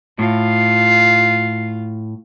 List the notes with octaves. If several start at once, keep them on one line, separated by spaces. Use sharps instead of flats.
A2 F4